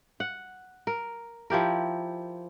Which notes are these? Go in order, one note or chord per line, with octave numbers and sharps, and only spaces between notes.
F#5
A#4
F3 E4 G4 A#4